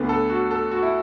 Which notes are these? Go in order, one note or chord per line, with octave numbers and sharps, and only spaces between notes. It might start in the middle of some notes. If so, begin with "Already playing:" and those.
Already playing: D2 D3 B3 B4
A4
F#4
A4
F#4
E4